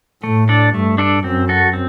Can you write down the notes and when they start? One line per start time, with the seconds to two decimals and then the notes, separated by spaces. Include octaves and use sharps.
0.23 A2 A3
0.49 D4 A4 D5
0.73 G2 A3
0.98 D4 A4 D5
1.24 F#2 C4
1.49 F#4 A4
1.73 C4